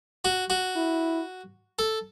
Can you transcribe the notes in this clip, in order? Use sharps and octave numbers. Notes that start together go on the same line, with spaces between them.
F#4
F#4
E4
A4